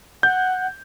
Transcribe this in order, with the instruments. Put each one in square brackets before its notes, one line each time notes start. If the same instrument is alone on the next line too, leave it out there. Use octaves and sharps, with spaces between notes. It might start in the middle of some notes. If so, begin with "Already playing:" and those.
[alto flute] F#5 [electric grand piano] G6